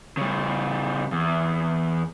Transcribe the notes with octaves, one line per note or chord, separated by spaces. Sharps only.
C#3 G3
E2